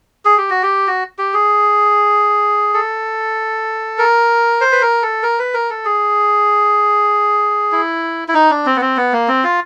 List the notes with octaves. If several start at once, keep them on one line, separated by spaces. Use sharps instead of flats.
G#4
G4
F#4
G4
F#4
G4
G#4
A4
A#4
C5
B4
A#4
A4
A#4
B4
A#4
A4
G#4
E4
E4
D#4
D4
C4
B3
C4
B3
A#3
C4
F4